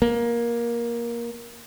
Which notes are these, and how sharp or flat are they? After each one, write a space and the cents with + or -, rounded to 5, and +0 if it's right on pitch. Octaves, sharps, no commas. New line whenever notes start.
A#3 +15